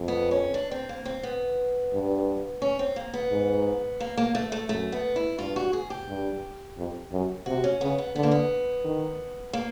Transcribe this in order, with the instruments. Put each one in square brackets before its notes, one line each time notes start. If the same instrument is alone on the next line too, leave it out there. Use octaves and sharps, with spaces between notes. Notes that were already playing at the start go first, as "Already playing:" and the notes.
Already playing: [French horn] F2
[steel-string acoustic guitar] B3
C#4
D4
C4
A#3
C4
B3
[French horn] G2
[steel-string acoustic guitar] C#4
C4
A#3
B3
[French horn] G#2
[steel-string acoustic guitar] A#3
A#3
A3
A3
[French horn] F#2 [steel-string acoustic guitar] A3
[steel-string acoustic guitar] B3
E4
[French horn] G2 [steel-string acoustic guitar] F4
[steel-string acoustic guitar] F#4
G#4
G4
[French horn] G2
F2
F#2
[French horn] C3 [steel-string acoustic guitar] F#4
[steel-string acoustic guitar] C#4
[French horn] C#3 [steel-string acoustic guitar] B3
[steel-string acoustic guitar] B3
[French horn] D3 [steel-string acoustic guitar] B3
[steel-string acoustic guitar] A#3
B3
[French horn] D#3
[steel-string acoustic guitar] A#3